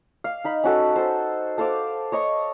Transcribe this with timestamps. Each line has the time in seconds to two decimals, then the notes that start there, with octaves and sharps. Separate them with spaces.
0.24 F5
0.44 D#4 B5
0.64 C#4 F#4 A4
0.96 A4 C5
1.58 A4 C5 F5 D6
2.12 C#5 D#5 C#6